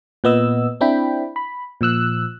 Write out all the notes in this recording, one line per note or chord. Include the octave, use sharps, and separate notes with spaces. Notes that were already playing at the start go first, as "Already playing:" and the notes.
A#2 B3 D#5 E6
C4 D4 E4 G5 B5
B5
A#2 F3 E6 F#6